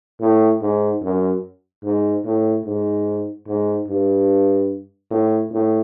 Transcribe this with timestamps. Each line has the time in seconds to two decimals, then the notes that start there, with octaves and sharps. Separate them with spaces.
0.21 A2
0.61 G#2
1.02 F#2
1.84 G#2
2.25 A2
2.65 G#2
3.47 G#2
3.88 G2
5.11 A2
5.51 A2